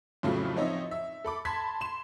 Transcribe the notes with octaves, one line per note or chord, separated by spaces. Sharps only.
F2 A2 C#3 F3 F#3 A3
F3 C4 D#4 C#5 D#5 E5
E5
A4 B5 D6
A5 B5 C6 G#6 B6
C6 E7